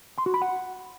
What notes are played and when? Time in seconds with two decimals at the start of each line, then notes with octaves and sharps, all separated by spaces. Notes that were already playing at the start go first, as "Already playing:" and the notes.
0.18 C6
0.26 F#4
0.34 B5
0.42 F#5